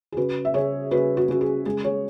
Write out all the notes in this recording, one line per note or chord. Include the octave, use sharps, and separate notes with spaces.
G#4
C#3 F#4 B4
E5
C#3 G#4 C#5
C#3 F#4 B4
F#4
C#3 F#4
G#4
G#3 G#4
G#4 C#5